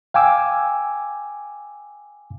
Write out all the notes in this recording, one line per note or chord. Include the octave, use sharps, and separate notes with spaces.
F5 G5 G#5 D6 E6